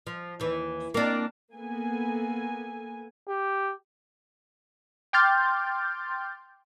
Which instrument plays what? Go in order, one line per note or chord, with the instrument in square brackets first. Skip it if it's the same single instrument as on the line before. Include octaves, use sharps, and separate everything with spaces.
[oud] F3
D#2 E3
A#3 C4 D4
[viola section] A#3 B3 A4 G#5
[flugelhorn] G4
[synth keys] G5 C6 D6 F6 G6 A6